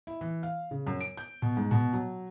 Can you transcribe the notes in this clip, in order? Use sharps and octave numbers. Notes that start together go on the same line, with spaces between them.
E4
E3
F5
C#3
F#2
D7
G6
B2
G#2
B2
F#3